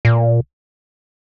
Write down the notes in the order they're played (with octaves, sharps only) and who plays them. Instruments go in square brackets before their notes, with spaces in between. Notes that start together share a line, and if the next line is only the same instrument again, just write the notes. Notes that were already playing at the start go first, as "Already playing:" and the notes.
[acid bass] A#2